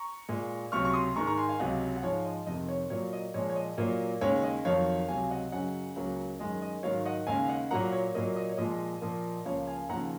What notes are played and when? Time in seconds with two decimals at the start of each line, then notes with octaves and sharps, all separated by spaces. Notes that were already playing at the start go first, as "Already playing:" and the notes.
Already playing: A#5 C#6
0.29 A#2 G#3
0.72 C#2 C3 F#3 C#6 F6
0.85 C#6
0.93 C6 D#6
1.16 G#2 D#3 G#3 A#5 C#6
1.27 A#5 C#6
1.38 G#5 C6
1.49 F5 G#5
1.59 C#2 C3 F#3 D#5 F#5
1.97 F#5
2.03 G#2 F3 G#3 C#5 F5
2.25 D#5
2.47 F2 C3 D#3 D#5
2.68 C#5
2.90 A#2 F#3 A#3 C#5
3.13 D#5
3.34 A#2 F3 G#3 C#5
3.50 C#5
3.56 D#5
3.78 A#2 F#3 A#3
4.21 D#2 C#3 G#3 C#5 F5
4.43 D#5
4.65 F2 D#3 F#3 C#5 F5
5.08 C#2 C3 F#3 F5 G#5
5.31 D#5 F#5
5.52 F#2 C#3 F#3 D#5 F#5
5.96 C#2 C#3 F#3 A#3
6.39 F#2 D#3 G#3 D#5
6.62 D#5
6.83 G#2 D#3 F#3 C#5 F5
7.05 D#5 F#5
7.27 D#2 C#3 G#3 F5 G#5
7.45 F5
7.48 D#5 F#5
7.71 A#2 F#3 A#3 F#5 A#5
7.93 C#5
8.15 A#2 F#3 A#3 D#5
8.36 D#5
8.49 C#5
8.58 A#2 F3 G#3 D#5
9.01 A#2 F3 A#3
9.45 C#2 C#3 F3 A#3 C#5 F5
9.67 F5 G#5
9.89 D#2 C#3 F3 F#5 A#5